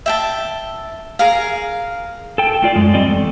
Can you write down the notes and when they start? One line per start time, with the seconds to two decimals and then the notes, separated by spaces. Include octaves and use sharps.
0.06 E5 G5 A5
1.19 G#4 A#4 F5
2.38 A4 G5
2.62 A3 F4 D5
2.76 F#2 G#3
2.93 G3 C4 D5 D#5
3.06 E2 A3